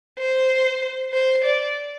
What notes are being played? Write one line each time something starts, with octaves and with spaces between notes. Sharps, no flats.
C5
C5
D5